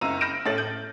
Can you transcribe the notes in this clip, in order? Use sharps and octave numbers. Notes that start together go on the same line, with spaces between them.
F#1 C#2 A#5 E6 D#7
B5 F6 G6 A#6 D7 E7
A2 C#4 A4 A6 F#7
G6